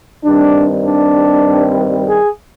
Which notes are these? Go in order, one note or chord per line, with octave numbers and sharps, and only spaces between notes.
G2 D#3 G3 C4 D4
D4
G#4